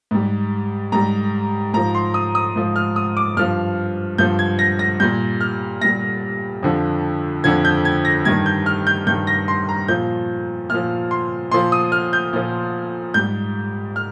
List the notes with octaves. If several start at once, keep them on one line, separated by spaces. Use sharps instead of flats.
G#2 G3
G#2 G3 A#5
G#2 F3 A#5
C6
D#6
D#6
G#2 F3
F6
D#6
D6
G2 F3 F6
G2 F3 G6
G#6
A#6
A#6
A#2 G3 G6
F6
A#2 G3 A#6
F2 D3 F3
F2 D3 F3 G#6
G6
G#6
A#6
G2 D#3 G3 G#6
G6
F6
G6
G2 D#3 G3 G6
A#6
C6
A#5
A#2 F3 G6
A#2 F3 F6
C6
A#2 F3 C6
D#6
F6
G6
A#2 F3
G#2 G3 G6
F6